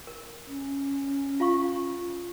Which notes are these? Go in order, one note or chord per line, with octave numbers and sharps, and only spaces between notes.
A#4
C#4
F4 F5 C#6